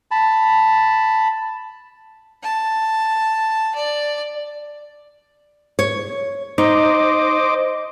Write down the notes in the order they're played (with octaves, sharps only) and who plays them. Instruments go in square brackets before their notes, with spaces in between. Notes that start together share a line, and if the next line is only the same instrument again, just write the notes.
[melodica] A5 B5
[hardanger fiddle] A5
D5
[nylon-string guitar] C#5
[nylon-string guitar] D#4 [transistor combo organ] C5 D#5 D6